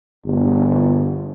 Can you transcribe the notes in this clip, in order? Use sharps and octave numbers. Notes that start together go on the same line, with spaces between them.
G1